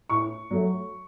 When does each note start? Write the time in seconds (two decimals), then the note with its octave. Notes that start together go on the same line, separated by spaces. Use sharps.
0.09 A2 C#6
0.51 F#3 A3